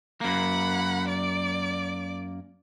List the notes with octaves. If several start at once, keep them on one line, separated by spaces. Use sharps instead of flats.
F#2 A#3 F#5 B5
D5 D7